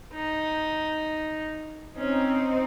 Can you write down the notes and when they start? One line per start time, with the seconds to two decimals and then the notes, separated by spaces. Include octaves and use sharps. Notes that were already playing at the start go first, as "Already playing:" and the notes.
0.13 D#4
1.96 C4 C#4 D#4